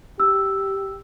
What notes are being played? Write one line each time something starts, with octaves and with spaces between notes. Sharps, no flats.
G4 E6